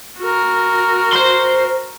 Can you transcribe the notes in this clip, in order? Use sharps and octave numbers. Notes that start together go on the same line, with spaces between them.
F#4 A#4
C5 C6